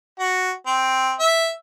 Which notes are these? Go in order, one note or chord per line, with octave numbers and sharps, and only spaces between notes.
F#4
C4
E5